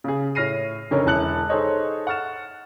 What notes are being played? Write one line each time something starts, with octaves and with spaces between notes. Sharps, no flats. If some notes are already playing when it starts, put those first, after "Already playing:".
C#3 G#4
A2 C#5 F6 A#6 C7 D#7
F2 D3 C#4 D#4 A#4 C#5
E1 E3 A5 F#6 C#7 F#7
D#4 G#4 A4 C5 C#5 D#5
F#5 C#6 F6 A6 E7